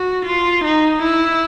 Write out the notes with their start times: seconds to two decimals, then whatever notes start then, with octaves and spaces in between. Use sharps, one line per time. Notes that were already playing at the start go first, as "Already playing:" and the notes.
Already playing: F#4
0.25 F4
0.64 D#4
1.02 E4